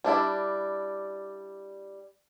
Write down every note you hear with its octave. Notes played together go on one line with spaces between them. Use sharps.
G3 D4 E4 D5